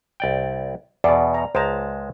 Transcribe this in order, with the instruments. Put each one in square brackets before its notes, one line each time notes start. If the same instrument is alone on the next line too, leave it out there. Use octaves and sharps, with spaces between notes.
[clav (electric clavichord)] C2 D5 G5
[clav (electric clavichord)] E2 B2 [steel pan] D5
[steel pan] A#5
[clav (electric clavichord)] C#2 G#3 A5 [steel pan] C5 A#5